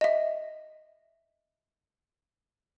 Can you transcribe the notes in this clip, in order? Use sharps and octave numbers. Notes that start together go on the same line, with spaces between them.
D#5 E5